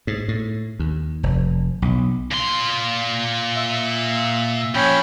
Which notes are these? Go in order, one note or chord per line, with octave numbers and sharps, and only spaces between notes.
G#2
A2
D#2
F1
B1
A#2 C6
E5
A#2 F3 C#4 G5 B5